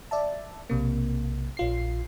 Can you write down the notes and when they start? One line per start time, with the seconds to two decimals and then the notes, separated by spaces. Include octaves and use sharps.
0.11 D5 E5 A5
0.70 B1 C3 A#3
1.57 A#1 F4 C7